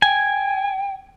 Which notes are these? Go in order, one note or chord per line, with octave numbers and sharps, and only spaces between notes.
G5 G#5